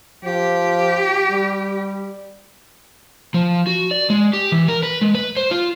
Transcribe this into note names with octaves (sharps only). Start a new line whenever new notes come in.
F3 G4
G3
F3
F#4
D5
G#3
G4
E3
A#4
B4
G#3
B4
C5
F4